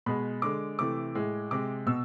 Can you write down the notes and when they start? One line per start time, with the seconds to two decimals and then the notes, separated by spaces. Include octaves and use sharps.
0.06 B2 G#3 B5
0.42 D3 G#3 D6
0.79 C3 E3 A3 D6
1.15 A2 G#3
1.51 C3 G#3 D6
1.87 B2 E6